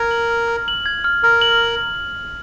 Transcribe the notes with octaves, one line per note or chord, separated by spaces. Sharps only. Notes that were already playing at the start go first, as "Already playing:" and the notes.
Already playing: A#4 G#6
F#7
F6
F6
F#7
G#6
F6
A#4 F6
F#7